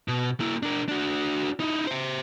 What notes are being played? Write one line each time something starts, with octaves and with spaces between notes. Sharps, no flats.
B2
A#3 E4
D4 A#4
D4 F#4
D#4 E4
C5 E5